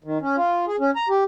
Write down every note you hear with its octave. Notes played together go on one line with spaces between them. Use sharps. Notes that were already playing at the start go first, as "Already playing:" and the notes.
D#3
C#4
F4
G#4
C#4
A#5
G4